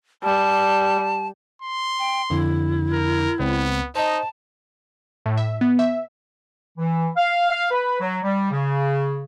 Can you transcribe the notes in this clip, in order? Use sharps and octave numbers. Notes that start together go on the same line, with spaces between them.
G3 A5
C6
G5
F2 D3 E4
A#4
C#2 B3 C4
D#4 C5 D#5 A5
A2
E5
B3
E5
E3
F5
F5
B4
F#3
G3
C#3